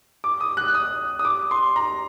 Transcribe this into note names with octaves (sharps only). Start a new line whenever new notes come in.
D6
D#6
F#6
D#6
D#6
D6
C6
A#5